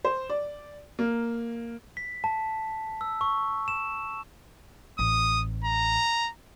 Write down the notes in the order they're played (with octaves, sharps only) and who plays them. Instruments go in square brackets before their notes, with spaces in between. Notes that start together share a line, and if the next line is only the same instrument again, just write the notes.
[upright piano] C5
D5
A#3
[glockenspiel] B6
A5
E6
C#6
E7
[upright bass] A1 [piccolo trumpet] D#6
[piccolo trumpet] A#5